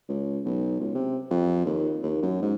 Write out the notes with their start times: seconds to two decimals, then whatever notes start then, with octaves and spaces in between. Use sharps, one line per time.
0.09 C#2
0.45 B1
0.80 C#2
0.95 C3
1.30 F2
1.65 D#2
2.03 D#2
2.22 F#2
2.42 G#2